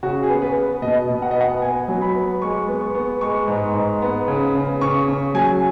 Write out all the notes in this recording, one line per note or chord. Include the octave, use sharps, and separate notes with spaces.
C#3 F#4
G#4
B3
B4
B3
B2 D#5
B2
F#5
B3 D#5
F#5
B3 G#5
F#3
B5
B3
G#3 C#6
B3
C#6
B3
G#3 C#6
G#2
G#2
B3
C#3
C#3
C#3 C#6
C#3
F#3 G#5